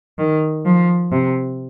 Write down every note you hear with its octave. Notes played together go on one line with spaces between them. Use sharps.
D#3
F3
C3